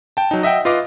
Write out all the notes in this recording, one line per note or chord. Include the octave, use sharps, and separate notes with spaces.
G5 A5
F#3 D#4
D#5 E5 F#5 G5
F4 B4 D#5 F5 D6